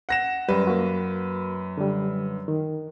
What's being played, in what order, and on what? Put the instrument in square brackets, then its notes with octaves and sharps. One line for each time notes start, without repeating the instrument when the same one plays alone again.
[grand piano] F#5 A#6 E7
[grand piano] F#2 B4 [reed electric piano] G3
[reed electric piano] A#3 F#4
D3 G3
D#3